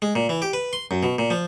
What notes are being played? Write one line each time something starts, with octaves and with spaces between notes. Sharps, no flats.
G#3
A#2
E3
G4
B4
C6
F#2
B2
A#2
F3